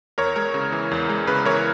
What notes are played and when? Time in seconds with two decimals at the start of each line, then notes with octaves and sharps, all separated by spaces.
0.18 E2 A#4 C#5
0.36 G#3 A#4
0.54 C#3
0.72 E3
0.91 E2
1.09 G#3
1.27 C#3 B4
1.45 E3 A#4 C#5